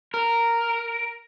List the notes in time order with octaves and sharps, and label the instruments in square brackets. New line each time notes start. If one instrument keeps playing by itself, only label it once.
[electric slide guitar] A#4